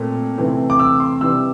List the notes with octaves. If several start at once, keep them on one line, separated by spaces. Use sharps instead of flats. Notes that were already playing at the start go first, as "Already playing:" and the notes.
Already playing: A#2 A3 C4
C3 E3 A3 C4
D6
E6
C6
C3 E3 G3 E6